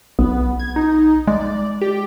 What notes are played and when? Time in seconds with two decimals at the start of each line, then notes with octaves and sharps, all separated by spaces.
0.19 B1 B3
0.59 G#6
0.76 D#4
1.28 G#3 D5
1.81 G4